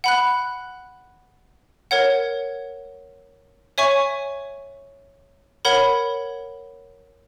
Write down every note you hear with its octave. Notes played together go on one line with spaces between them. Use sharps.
F#5 B5 F#6
A#4 C#5 F#5
C#5 E5 G#5 C#6
A#4 C#5 F#5 B5